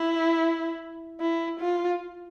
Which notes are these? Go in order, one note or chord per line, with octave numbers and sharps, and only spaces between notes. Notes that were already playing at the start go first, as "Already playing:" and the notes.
Already playing: E4
E4
F4